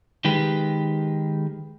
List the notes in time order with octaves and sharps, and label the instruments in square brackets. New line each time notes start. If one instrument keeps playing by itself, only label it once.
[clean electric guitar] D#3 G#3 G4 B4